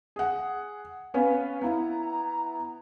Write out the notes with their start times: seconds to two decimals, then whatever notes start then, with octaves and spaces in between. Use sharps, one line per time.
0.16 G#4 F#5
1.14 B3 C#4 B4 F5
1.61 B3 E4 A#5